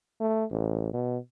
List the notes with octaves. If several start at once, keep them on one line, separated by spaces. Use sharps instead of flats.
A3
A1
B2